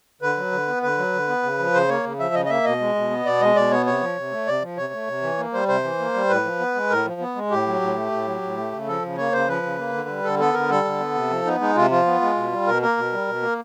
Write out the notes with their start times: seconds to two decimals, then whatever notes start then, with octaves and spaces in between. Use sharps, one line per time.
0.22 D3 B4
0.37 F#3
0.52 D3
0.68 B3
0.83 D3 B4
0.98 F#3
1.13 D3
1.28 B3
1.43 C#3
1.59 F3
1.74 C#3 C5
1.89 A#3 C#5
2.04 C#3
2.19 F3 E5
2.34 C#3 D#5
2.45 D#5
2.49 A#3 E5
2.65 B2 D#5
2.80 G#3
2.95 B2
3.10 B3
3.25 B2 D5
3.41 G#3 D#5
3.56 B2 D5
3.71 B3 C#5
3.86 C3 C#5
4.01 F3
4.17 C3
4.32 A3
4.47 C3 D5
4.62 F3
4.77 C3 C#5
4.93 A3
5.08 C3
5.22 E3
5.38 A#3
5.53 G3 C5
5.68 C3 C5
5.84 E3
5.99 A#3
6.14 G3
6.29 A2 B4
6.44 F3
6.59 B3
6.75 G#3
6.90 A2 A#4
7.05 F3
7.21 B3
7.36 G#3
7.50 A2 G4
7.66 F#3
7.81 A2
7.96 A3
8.12 A2
8.27 F#3
8.42 A2
8.57 A3
8.72 C#3
8.87 F3 A4
9.02 C#3
9.17 A#3 C#5
9.33 C#3 C5
9.48 F3 B4
9.63 C#3
9.78 A#3
9.93 D3
10.09 G3
10.24 D3 A4
10.39 B3 A4
10.54 D3 A#4
10.69 G3 A4
10.85 D3
11.00 B3
11.15 C3
11.30 F3
11.45 B3 D#4
11.60 G#3 D#4
11.76 C3 F4
11.91 F3 F4
12.06 B3
12.22 G#3
12.36 B2
12.52 G3
12.67 B2 A#4
12.82 A#3 A#4
12.97 B2
13.12 G3
13.27 B2
13.42 A#3